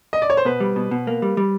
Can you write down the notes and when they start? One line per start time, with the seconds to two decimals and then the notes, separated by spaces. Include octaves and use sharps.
0.13 D#5
0.22 D5
0.30 C#5
0.37 C5
0.45 B2 B4
0.60 G3
0.76 B2
0.91 B2
1.07 A#3
1.22 G3
1.37 G3